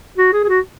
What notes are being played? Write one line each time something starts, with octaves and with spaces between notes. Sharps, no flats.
F#4
G#4
G#4
F#4